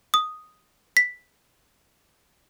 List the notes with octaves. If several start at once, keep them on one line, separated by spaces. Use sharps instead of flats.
D#6
B6